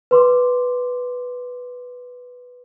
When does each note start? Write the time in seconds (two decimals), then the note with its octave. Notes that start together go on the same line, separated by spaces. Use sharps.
0.11 B4 C6 D6